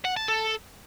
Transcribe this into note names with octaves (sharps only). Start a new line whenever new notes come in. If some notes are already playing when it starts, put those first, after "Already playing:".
F#5
A5
A4